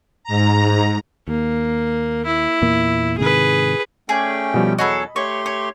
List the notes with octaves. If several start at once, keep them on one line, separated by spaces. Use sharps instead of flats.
G#2 A#5
D#2 A#3
E4
E2 A#2 A#3
G#2 C3 D#3 G#4 B4
A3 C#4 G#4 D5 G5
B2 F3 G3
E2 F#3 F#4 G#4 A4 C#5 D#5 B5
A3 G4 C#5 C6
C#5 D6